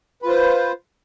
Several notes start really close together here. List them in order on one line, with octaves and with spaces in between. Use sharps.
B4 F4 C5